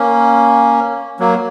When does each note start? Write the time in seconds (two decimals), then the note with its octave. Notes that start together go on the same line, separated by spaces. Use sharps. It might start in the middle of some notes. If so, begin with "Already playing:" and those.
Already playing: A#3 C#4
1.20 F#3 A#3